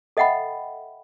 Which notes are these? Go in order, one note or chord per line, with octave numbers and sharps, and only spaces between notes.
A4 D#5 E5 F#5 G5 B5